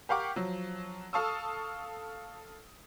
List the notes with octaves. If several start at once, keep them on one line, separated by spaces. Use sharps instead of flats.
G4 A#4 F5 F#5 C#6 D6
F3 F#3
A4 F5 A5 C#6 D#6 E6